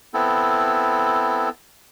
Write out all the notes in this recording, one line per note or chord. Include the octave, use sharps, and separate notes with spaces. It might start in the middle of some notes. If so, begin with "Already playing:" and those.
B3 C4 E4 A4